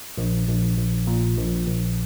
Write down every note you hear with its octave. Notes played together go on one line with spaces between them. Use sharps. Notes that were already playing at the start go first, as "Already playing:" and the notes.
A#1
A#1
A#1
A#2
A#1
A#1